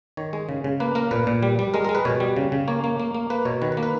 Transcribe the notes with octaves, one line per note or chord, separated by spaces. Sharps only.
D#3 C#5
G#3
C#3
C#3
A#3 B4
A#3 A#4
A#2 B4
A#2
G3
G3
G#3 A#4
G#3 A#4
B4
B2 C#5
G3
C#3
C#3
A#3 C#5
A#3
A#3
A#3
A#3 B4
B2 C#5
D#3 B4
B4
A#3
B4